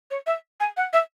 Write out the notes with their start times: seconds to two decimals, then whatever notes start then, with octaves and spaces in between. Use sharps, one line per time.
0.11 C#5
0.27 E5
0.60 G#5
0.77 F#5
0.93 E5